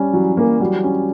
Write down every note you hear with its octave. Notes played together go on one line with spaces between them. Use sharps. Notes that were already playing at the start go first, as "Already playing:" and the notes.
Already playing: G3 C#4
E3 F#3
E3 A#3
F#3 G3
C#4